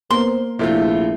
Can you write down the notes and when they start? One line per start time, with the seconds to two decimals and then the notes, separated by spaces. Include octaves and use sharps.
0.11 A#3 B3 A#4 C5 C6
0.59 A#1 C3 A3 E4 F4